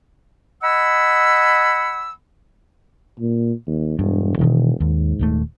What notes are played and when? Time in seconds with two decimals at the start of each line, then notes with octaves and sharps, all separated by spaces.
0.62 D#5 F#5 G#5 B5 E6
3.20 A#2
3.67 D#2
3.99 E1 G2
4.39 B2 D#3 E3
4.80 D#2 G#2
5.19 D#1 D#2 A3